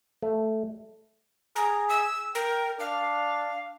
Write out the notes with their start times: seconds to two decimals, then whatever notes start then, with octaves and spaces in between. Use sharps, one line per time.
0.22 A3
1.56 G#4 A#5
1.89 E6
2.35 A#4 G5
2.80 D4 F5